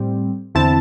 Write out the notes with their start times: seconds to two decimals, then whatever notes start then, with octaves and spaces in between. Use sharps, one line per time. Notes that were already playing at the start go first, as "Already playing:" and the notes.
Already playing: A2 G3 C4
0.55 E2 D3 C4 E4 A5